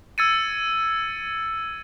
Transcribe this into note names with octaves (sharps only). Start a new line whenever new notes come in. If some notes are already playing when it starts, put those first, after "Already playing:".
E6 G#6 A6 C#7 D#7